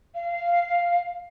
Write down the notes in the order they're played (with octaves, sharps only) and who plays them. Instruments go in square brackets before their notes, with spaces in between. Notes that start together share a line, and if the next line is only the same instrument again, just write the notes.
[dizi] F5